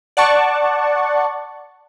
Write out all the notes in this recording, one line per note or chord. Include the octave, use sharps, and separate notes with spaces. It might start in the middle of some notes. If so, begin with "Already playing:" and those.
D5 F#5 A5 C#6